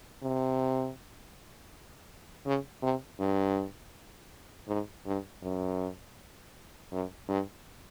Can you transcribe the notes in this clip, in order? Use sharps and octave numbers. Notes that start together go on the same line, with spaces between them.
C3
C#3
C3
G2
G#2
G2
F#2
F#2
G2